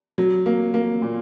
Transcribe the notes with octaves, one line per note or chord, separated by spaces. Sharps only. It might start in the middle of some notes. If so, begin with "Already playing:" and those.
F#3
A#3
A#3
A#2